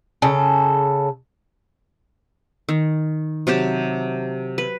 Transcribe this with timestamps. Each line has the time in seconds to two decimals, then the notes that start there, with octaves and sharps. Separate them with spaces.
0.22 C#3 A4
2.69 D#3
3.47 C3 F#3 G4 A5
4.58 B4